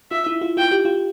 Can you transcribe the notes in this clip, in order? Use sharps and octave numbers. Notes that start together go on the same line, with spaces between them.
F4 E5
E4
F4
F4 G5
G4
F4